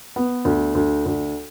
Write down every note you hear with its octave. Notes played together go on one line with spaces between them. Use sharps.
B3
D2
D2
D2